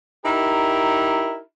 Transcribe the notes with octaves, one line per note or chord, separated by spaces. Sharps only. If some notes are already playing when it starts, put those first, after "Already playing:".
D#4 E4 G4 A#4